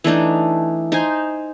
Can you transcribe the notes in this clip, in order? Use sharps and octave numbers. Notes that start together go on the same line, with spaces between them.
E3 A3 D4 D#4
D#4 C5 G#5